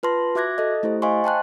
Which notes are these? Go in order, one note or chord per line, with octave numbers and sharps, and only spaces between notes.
F4 B4 A5 C6 A#6
F#4 E5 D6 F#6 G#6 A#6
A4 D#5
A3 E4 G4 C5
C5 D#5 F5 G#5 C6 C#6
G5 A5 C6 F#6